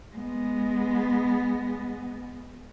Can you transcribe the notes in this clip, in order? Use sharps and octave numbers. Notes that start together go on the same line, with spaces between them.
G#3 B3